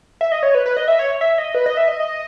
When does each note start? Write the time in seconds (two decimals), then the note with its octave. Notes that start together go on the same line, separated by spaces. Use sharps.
0.21 E5
0.32 D#5
0.43 C#5
0.55 B4
0.66 B4
0.77 D#5
0.88 E5
0.99 C#5
1.21 E5
1.38 D#5
1.54 B4
1.66 D#5
1.77 E5
1.88 D#5